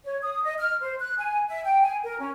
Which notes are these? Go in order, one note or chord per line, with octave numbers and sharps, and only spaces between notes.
C#5
D#6
D#5
F6
C5
F#6
G#5
E5
G5
G#5
A#4
C#4